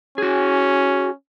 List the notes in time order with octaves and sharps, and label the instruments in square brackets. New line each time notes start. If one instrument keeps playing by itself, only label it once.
[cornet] C#4 [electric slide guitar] F#4 G#4